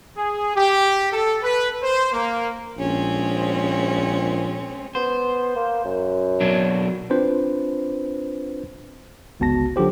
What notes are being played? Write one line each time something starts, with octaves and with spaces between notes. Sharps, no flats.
G#4
G4
A4
B4
C5
A#3
A#1 G#3 C4 C#4
B3 C5
A#3
F#2
B2 F#3 D4
C4 D4 F4 B4 C5
G1 C#2 B3 F#4 A5 A#6
D3 F#3 F4 G4 C5